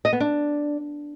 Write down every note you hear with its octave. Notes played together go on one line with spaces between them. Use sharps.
D#5
B3
D4